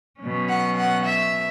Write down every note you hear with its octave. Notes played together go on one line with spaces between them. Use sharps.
B2 F#3 C#4
F#5
F#5
E5